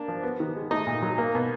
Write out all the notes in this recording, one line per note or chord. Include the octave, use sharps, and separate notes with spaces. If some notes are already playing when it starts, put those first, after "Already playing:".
Already playing: A#3 D4
F3
B3
D#3
G#3
A3 D#4 D#5
A#2
F#3
A#3
B2